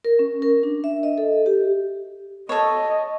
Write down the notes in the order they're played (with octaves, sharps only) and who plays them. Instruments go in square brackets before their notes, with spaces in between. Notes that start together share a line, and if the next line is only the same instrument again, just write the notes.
[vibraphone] A#4
C#4
A#4
D4
E5
D#5
A4
G4
[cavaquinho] A4 C#5 [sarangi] D#5